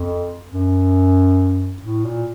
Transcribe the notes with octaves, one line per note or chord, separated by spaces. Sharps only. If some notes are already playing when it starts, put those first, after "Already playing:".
Already playing: F2
F#2
A2
A#2